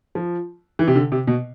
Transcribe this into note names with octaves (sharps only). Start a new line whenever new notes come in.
F3
E3
C3
D3
C3
B2